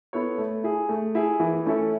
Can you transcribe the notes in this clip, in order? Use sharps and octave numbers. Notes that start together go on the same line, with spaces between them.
B3 E4 A4 C#5
A3
E4 G#4
A3
E4 G#4
E3
A3 C#4 E4 A4